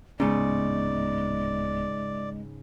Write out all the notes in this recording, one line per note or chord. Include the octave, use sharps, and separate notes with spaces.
D1 G#2 C#3 G#3 B3 C#4 D5